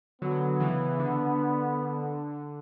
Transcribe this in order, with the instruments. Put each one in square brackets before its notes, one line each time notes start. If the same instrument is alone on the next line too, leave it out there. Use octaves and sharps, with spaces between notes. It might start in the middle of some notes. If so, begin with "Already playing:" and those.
[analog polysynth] D3 F#3 [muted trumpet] B3
[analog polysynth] C#3 E3
D3